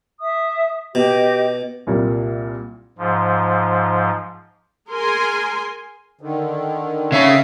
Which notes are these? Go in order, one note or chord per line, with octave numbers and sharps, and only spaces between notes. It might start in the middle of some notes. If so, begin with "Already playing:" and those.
E5 D#6
B2 G4 D#5
C2 A#2 G3
G#2 F3
G#4 A#4 G#5 C6
D3 D#3
C#3 C#4 E5 F5